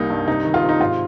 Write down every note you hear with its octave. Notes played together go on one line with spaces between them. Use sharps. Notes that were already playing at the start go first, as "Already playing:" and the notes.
Already playing: C2 G3 A#3 D#4
G2
C3 D#4
D#3
F4
C3
D#4
G#2 F4